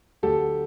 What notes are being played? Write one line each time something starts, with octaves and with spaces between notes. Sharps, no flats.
D2 D3 F#3 G4 A4